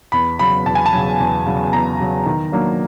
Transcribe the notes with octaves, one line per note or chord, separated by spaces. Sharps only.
E2 B5
C#3 F#3 B5
E2 A5
G#5
A5
C#3 F#3
E2
C#3 F#3
E2 A#5
C#3 F#3
D#3
F#3 A#3 D4